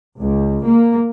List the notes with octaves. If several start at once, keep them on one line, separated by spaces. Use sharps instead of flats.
C#2
A#3